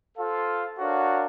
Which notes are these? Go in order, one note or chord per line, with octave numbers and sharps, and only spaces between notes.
F4 A4 C5 F5
D4 F#4 A#4 C#5 F5